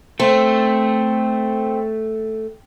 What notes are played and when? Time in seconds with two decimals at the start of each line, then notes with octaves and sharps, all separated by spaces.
0.20 A3 C4